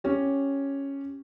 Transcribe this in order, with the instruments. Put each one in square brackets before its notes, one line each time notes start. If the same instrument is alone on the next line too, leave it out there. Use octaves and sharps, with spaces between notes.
[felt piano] C#4 G4